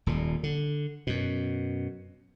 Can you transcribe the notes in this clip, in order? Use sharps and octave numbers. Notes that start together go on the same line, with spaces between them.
D#1 A#2
D3
F#2 B2